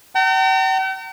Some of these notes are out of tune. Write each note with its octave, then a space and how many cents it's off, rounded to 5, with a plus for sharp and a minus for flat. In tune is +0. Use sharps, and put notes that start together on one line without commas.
G5 -45 A#5 -45